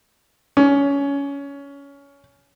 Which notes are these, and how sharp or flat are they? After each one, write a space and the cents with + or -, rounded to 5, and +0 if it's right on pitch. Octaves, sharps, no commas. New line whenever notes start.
C#4 +20